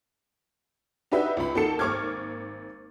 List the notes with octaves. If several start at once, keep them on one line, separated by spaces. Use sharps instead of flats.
D4 D#4 F#4 G4 B4 E5
C#2 B5
D#3 A#3 F#4 A4 A5 C#7
G#1 A#3 C#6 D6 F6 G#6